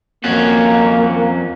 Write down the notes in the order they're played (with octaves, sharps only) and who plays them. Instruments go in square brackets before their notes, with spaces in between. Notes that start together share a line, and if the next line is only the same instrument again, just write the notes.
[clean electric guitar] F2 C#4 F#4 [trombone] A#3